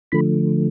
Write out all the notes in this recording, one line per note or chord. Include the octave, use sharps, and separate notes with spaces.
D3 F3 A3 B5